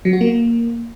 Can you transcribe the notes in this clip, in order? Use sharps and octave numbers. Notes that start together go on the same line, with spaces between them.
F#3
F#4
A#3